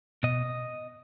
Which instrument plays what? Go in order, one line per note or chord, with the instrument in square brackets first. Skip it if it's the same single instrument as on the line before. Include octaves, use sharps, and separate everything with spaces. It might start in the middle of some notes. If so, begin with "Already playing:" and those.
[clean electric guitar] B2 D#5